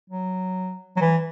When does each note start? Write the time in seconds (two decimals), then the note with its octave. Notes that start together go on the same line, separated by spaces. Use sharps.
0.10 F#3
0.96 F#3
1.01 E3